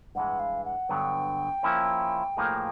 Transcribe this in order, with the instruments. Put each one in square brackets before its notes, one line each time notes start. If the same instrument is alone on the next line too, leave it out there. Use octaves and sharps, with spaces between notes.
[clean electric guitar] G2 E3 G#3 [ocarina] F#5
[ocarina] F5
F#5
[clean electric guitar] G2 D3 F#3 B3 [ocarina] G5
[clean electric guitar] F3 A#3 C#4 E4
A2 F3 A#3 D#4 G#4